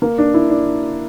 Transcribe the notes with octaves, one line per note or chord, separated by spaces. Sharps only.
A#3
D4
E4
D4